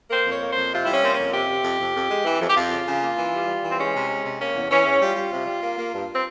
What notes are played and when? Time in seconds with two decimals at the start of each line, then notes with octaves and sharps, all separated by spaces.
0.10 A#3 C5
0.26 F2 C#5
0.41 A#3
0.52 C5
0.57 F2
0.72 C3 F4
0.84 G3 E4
0.92 C#4
1.02 A#3 C4
1.13 C#4
1.18 F2
1.33 C3 G4
1.48 C3
1.64 F2
1.79 F2
1.95 F2
2.10 G#3
2.25 E3
2.40 F2
2.49 G4
2.55 F2 F4
2.71 C#3
2.86 C#3
3.01 A#3
3.17 E3
3.33 G3
3.47 G3
3.63 E3
3.70 C4
3.78 G#3 C#4
3.94 C3
4.09 G#3
4.24 C3
4.40 A#3 C#4
4.55 E2
4.70 E3 C#4
4.85 E2
5.01 G3 F4
5.16 G3
5.32 C3
5.47 G3
5.62 A#3
5.78 A#3
5.93 G2
6.13 C4